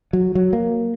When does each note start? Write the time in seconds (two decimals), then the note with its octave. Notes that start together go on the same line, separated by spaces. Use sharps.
0.13 F#3
0.35 F#3
0.53 A#3